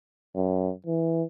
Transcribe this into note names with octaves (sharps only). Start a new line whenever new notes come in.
F#2
E3